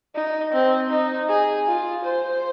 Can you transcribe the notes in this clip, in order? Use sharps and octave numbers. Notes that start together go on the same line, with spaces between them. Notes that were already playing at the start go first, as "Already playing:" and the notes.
D#4
C4
D#4
G#4
F4
C5